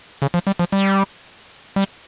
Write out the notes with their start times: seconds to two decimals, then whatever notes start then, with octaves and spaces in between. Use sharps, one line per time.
0.22 C#3
0.34 F3
0.47 G3
0.59 F3
0.72 G3
1.76 G3